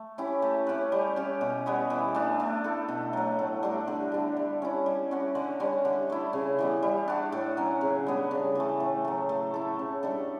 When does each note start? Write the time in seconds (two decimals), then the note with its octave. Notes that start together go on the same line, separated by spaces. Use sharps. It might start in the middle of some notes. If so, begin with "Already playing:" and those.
Already playing: A3
0.18 C#4 E4 G4
0.42 A3
0.67 C#4 G4 B4
0.92 G3
1.16 C#4 G4
1.41 B2
1.66 G3 B3 F#4
1.90 E3
2.15 A3 D4
2.40 A3
2.64 E4 A4
2.88 B2
3.13 F#3 A3
3.39 A2
3.63 G3 D4 F#4
3.88 D3
4.12 G3 D4
4.37 G3
4.62 C#4 E4
4.86 G3
5.11 C#4 F#4
5.35 D3
5.60 G3 C#4
5.85 D3
6.10 A3 E4
6.33 C#3
6.59 E3 G3 B3
6.83 G3
7.08 D4 F#4
7.32 A2
7.57 F#3 C#4
7.81 C#3
8.07 G3 B3 D4
8.31 C#3
8.55 E3 A3
8.80 A2
9.05 F#3 A3
9.29 A3
9.54 E4 A4
9.79 C#3
10.03 G3 D4 A4